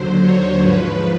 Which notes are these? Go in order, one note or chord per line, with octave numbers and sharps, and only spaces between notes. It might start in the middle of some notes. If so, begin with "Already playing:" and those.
Already playing: D#2 D3 F#3 C5
C#5
G#2 F3 B4